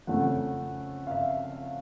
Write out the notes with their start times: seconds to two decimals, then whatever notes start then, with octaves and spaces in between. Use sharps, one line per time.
0.07 F2 C#3 F3 A3 C#4 F#5
1.07 F5
1.11 E5